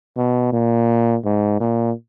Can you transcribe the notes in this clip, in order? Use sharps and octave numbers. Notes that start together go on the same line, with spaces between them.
B2
A#2
G#2
A#2